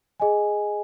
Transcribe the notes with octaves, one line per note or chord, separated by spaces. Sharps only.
G#4 D#5 G#5